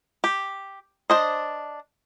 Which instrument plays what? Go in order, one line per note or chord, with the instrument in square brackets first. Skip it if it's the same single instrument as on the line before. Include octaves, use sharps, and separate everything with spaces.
[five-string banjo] G4
D4 C5 D#5